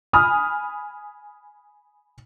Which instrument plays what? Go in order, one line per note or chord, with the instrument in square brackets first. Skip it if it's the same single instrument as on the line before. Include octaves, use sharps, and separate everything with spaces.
[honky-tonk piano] G#5 B5 D#6 F6